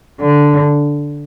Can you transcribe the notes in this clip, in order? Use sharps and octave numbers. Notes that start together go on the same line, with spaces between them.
D3